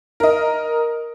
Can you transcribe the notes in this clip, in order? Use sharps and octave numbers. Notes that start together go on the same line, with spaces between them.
A#4 D#5